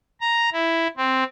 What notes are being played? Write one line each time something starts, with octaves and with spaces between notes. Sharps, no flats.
A#5
E4
C4